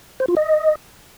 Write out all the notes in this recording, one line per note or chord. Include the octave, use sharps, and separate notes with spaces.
C5
F4
D#5